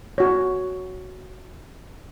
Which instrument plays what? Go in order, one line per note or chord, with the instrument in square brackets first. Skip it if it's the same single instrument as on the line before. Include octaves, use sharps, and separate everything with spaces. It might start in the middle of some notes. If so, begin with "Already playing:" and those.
[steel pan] F#4 C#5